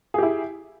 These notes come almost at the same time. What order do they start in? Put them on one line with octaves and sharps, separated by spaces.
G#4 G4 E4